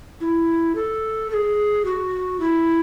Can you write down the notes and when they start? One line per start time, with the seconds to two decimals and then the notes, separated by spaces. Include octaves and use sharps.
0.21 E4
0.75 A4
1.30 A4
1.34 G#4
1.85 F#4
2.40 E4